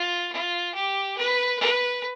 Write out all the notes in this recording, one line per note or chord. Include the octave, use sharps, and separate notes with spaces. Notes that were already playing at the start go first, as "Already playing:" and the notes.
Already playing: F4
F4
G4
B4
B4